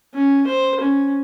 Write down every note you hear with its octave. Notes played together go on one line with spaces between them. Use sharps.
C#4
C5
C#4